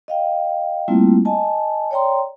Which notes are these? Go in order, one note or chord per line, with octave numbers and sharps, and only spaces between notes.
D#5 F5 G5
G3 A3 A#3 C4 E4 F4
D#5 G#5 A5
C#5 D5 G5 A#5 C6